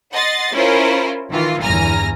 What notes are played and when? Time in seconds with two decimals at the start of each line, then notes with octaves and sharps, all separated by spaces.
0.13 D#5 F#5 C6 A6
0.53 C#4 E4 F4 A#4 C5
1.31 D#3 E3 F4
1.63 G1 E2 G#5 A#5 F6 A#6